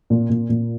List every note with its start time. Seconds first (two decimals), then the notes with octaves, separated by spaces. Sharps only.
0.10 A#2
0.30 A#2
0.49 A#2